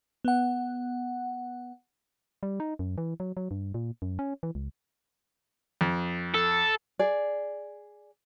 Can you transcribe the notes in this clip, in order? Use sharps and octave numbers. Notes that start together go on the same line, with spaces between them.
B3 F#5
G3
D#4
F#2
E3
F#3
F#3
G2
A#2
F#2
C#4
E3
C#2
F2
A4
G#4 D5